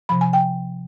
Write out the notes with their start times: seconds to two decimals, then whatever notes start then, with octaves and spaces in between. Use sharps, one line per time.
0.09 C3 F3 B5
0.21 G#5
0.33 G5